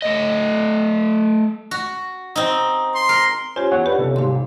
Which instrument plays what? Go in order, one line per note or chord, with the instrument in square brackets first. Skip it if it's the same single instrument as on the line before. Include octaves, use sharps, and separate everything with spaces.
[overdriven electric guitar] A3 D#5
[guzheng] F#4
C4 D#4
[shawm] C6
[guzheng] A#4
[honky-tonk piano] C#4 [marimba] F4 G4 [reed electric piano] C5 G#5
[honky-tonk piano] E2 [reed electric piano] C#5 F#5
[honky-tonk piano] D4 B4 [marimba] G4
[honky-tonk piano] B1 C#4 A4 [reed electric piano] C3
[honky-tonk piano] D#2 G#2 G3 [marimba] F5 C6